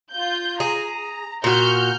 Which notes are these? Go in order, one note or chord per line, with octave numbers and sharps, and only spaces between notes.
F4 G6
G#4 A#5
A#2 F#4 F6 G6